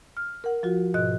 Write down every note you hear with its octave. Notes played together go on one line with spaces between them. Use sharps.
F6
A#4 F#5
F3 F4 F#4
G#2 B2 D#5 F#6